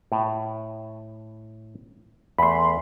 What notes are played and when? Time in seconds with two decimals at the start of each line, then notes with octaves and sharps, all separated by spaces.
0.12 A2
2.38 E2 A3 B5 C6